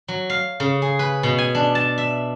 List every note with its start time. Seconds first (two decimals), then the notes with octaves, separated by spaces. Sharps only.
0.08 F#3
0.30 F5
0.60 C#3
0.82 G#4
0.99 B4
1.23 B2
1.38 G#5
1.55 D4
1.75 A5
1.98 E5